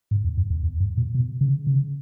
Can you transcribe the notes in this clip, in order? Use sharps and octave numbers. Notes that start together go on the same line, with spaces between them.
G#2
E2
F#2
E2
E2
F#2
A#2
B2
C#3
C#3